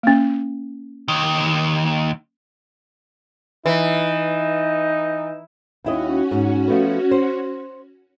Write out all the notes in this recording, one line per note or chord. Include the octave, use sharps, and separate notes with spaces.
A#3 C#4
D#2 D#3
E3 D#4
D#2 C#4 E4 F#4 D#5
G#2
F3 A3 B3
C5